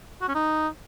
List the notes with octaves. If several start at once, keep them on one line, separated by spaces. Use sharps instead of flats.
F#4
C#4
D#4